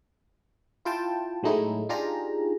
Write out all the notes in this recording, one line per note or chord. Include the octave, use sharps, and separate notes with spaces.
E4 F4 G5 A5
A2 F#3 G#3 A3 D#4 E4
D4 D#4 F4 G4 G#4 A#5